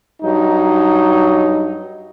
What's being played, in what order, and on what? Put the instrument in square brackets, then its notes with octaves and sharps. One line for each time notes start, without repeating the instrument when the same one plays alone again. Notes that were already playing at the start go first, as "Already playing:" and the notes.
[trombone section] G2 F#3 D#4